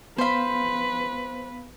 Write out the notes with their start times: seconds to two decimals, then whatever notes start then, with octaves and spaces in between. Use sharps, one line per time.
0.18 B3 B4 C5 F5 B5